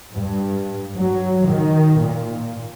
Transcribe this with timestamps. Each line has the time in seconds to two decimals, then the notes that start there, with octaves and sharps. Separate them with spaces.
0.14 G2
0.98 F#3
1.48 D#3
2.01 A#2